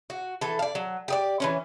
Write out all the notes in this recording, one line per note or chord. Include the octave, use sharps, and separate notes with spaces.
F#4
E3 A4
D5 F5
F#3
G4 G#4 D5
E3 F3 C#4